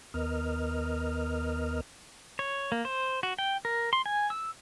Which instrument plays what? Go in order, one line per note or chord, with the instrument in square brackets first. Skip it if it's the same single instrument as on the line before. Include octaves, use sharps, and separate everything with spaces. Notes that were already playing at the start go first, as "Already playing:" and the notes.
[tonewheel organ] D#2 B3 A#4 D#5 F6
[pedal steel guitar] C#5
A#3
C5
F#4
G5
A#4
C6
G#5
E6